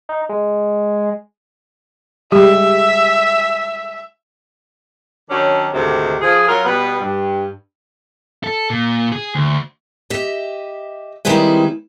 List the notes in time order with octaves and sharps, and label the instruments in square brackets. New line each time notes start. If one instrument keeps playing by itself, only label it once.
[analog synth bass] D#4
G#3
[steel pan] G3 G#3 [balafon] G4 [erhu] E5
[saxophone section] D#3 F#3 C#4 D4
D2 G#2 C3 D#3
F3 G#4
F#3 C#4 F4 A#4
B2 G3 B3
G2
[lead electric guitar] A4
A#2
G#4
D2
[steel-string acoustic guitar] G4 D#5 E5
D#3 G3 G#3 C4 E4 B4